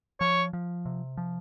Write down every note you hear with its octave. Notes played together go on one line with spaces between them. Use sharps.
F3 C#5
F3
C3
F3